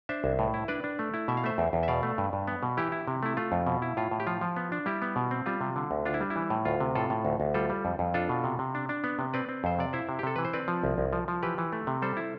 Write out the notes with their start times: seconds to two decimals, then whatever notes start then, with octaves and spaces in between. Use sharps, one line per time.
0.09 D4 C5 E5
0.24 C2
0.39 A2
0.54 E4
0.68 D4 B4 D5
0.84 D4
0.99 A3
1.14 E4
1.28 B2 E5
1.37 F5
1.44 A3 C5 E5
1.58 E2
1.73 E2
1.83 E5
1.88 B2 D5 F5
2.03 A3
2.18 G2
2.33 G2
2.48 B3
2.63 B2
2.77 E3 E4 G4
2.92 E4
3.08 C3
3.23 A3 E4
3.37 A3 F4
3.52 F2
3.67 B2
3.82 E4
3.97 A2 F4
4.11 A2
4.20 G4
4.27 F3 F4
4.41 F3
4.56 B3
4.72 D4
4.86 G3 E4 G4
5.02 B3
5.16 B2
5.31 C4
5.46 G3 F4
5.61 C3
5.76 D3
5.91 D2
6.06 D4 F4
6.14 E4
6.21 G3
6.30 E4
6.36 E3
6.50 A2
6.65 D2 F4
6.80 C3
6.95 A2 F4 A4
7.10 A2
7.25 D2
7.40 D2
7.54 G3 F4 A4
7.70 G3
7.85 F2
7.99 F2
8.14 D4 F4 A4
8.29 B2
8.44 C3
8.59 C3
8.75 D4
8.89 D4
9.04 B3
9.19 C3
9.34 C4 B4 D5
9.49 C4
9.64 F2 C5
9.79 C3 D5
9.93 E4 C5 E5
10.09 C3
10.19 G4
10.23 C3 A4
10.36 E3 B4
10.45 C5
10.53 C4 B4 D5
10.68 F3
10.83 C2
10.98 C2
11.13 F3
11.28 F3
11.43 E3 G4 B4
11.58 E3
11.73 A3
11.87 C3
12.02 G3 A4 C5
12.17 E4